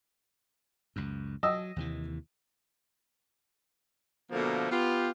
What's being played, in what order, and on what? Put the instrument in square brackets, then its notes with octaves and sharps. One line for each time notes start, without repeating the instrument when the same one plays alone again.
[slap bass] C#2 F#2
[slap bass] F#3 [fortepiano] D#5 D#6 E6
[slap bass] D#2 C3 E3
[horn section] B2 D3 F3 A3 A#3
B3 F4 G4